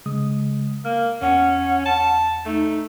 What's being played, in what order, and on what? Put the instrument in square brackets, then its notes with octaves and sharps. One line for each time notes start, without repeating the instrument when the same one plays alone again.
[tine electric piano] C#3 G#3 D#6
[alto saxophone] A#3 [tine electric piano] F6
[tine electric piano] E2 [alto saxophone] C#4 [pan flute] F#5
[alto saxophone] A5
[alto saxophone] A3 [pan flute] D#4